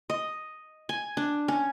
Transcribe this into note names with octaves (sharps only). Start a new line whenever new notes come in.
D#5
G#5
D4
C#4